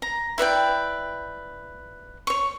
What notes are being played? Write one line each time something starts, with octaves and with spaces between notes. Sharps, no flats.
A#5
E4 B4 D5 G5
C#5 C#6